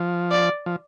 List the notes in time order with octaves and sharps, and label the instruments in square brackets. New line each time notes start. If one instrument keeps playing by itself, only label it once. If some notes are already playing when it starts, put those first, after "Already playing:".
Already playing: [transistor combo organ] F3
[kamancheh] D5
[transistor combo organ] F3